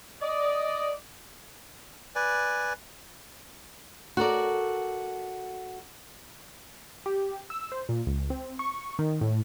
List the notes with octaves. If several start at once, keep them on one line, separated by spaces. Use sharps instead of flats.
D5 D#5
B4 D5 G#5
F#4 A4 A#4 D5
G4
E6
C5
A#2
C#2
C4
C#6
D#3
A2